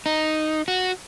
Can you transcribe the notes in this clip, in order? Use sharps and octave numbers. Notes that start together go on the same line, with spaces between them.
D#4
F#4